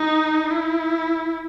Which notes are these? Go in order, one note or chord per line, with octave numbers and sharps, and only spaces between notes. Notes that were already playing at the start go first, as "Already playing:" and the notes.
Already playing: D#4
E4